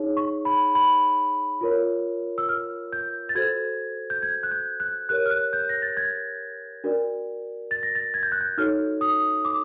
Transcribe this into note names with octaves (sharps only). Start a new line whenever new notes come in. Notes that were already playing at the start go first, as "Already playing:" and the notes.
Already playing: D#4 G#4 C#5
C#6
B5
B5
F4 A#4 C#5
E6
F6
G6
A6
F#4 A4 C5 G#6
G6
G#6
F#6
G6
F#6
G4 A#4 C#5 F#6
F6
F#6
G6
A#6
A6
G#6
D4 F#4 A#4 D5
A6
A#6
A6
G#6
G6
F#6
G6
D#4 F#4 A4 C#5 F6
D#6
D6